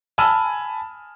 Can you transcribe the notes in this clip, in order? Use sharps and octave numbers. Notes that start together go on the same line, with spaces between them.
G#5 A5 B5 E6 F6 D#7